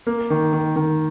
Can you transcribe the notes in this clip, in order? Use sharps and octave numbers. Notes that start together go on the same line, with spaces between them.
A#3
D#3
D#3
D#3